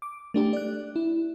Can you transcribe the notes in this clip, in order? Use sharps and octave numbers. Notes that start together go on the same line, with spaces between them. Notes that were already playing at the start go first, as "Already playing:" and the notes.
D6
A3 D4 G4
D5 F#6
E4